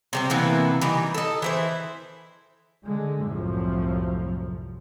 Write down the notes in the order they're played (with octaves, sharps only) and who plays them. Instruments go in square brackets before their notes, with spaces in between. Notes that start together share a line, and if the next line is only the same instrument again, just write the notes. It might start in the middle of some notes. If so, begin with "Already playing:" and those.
[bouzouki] C3 G3 C4
C3 E3 A#3 B3
E3 G3 D#4
A4 D#5
E3 E4 C5
[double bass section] D3 G#3
C2 F#2 A2 F3